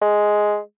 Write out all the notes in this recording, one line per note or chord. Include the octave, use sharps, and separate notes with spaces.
G#3